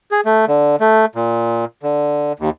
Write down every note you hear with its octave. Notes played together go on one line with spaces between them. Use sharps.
G#4
A3
D3
A3
A#2
D3
D#2